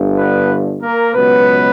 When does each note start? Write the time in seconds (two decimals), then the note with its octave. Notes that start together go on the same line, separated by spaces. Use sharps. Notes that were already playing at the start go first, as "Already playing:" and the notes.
Already playing: G1 G2 D3
0.17 B3 B4
0.82 A#3 A#4
1.13 C#2 B2 F#3 B3 B4